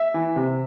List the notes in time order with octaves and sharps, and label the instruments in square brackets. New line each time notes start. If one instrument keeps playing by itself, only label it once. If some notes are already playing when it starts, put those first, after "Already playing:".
Already playing: [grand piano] E5
E3
C3